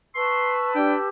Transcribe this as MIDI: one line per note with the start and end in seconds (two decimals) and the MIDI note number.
0.15 1.07 71
0.15 1.07 81
0.15 0.53 84
0.15 0.75 85
0.15 1.07 88
0.75 0.97 62
0.75 1.09 67
0.75 0.96 79